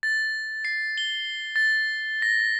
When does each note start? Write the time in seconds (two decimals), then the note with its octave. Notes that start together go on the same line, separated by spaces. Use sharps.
0.03 A6
0.65 C7
0.98 G7
1.56 A6
2.22 A#6